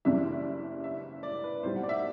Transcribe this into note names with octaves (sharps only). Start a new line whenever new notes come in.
F#1 F#2 E3 G3 D4 E5
E5
D5
B4
B1 A2 G3 C5
F#5
D5
E5